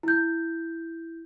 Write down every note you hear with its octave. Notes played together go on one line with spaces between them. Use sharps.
E4 G6